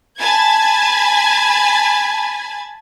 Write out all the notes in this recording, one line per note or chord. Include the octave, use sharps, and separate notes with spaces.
G#5 A5 B5 G#6